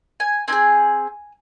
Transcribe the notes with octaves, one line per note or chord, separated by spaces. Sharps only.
G#5
C4 D#4 G#4 G#5